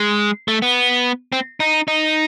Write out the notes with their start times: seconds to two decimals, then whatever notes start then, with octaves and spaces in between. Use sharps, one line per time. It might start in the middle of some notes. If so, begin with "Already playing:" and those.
Already playing: G#3
0.48 A3
0.62 B3
1.32 C4
1.60 D#4
1.88 D#4